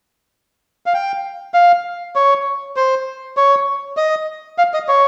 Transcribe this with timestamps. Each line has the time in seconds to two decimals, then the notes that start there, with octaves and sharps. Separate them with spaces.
0.86 F5
0.94 G5
1.54 F5
2.16 C#5
2.76 C5
3.37 C#5
3.97 D#5
4.58 F5
4.74 D#5
4.89 C#5